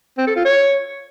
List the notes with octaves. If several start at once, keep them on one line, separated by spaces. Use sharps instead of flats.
C4
A4
F4
C#5